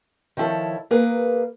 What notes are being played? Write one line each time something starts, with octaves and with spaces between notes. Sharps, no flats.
D#3 F3 E4 A4 C#5
A#3 G#4 A#4 B4